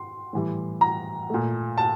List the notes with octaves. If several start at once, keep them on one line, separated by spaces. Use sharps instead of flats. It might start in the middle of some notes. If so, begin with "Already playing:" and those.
Already playing: C6
A2 E3 G3
A#5
A#2 A3
A5